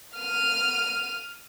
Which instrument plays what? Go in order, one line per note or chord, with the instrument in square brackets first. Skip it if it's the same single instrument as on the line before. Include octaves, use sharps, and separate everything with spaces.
[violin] F6 D#7